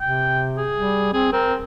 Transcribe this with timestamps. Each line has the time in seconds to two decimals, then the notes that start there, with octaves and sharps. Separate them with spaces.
0.01 C3 G5
0.57 G#4
0.76 G3
1.13 C4 G#4
1.33 C4 A#4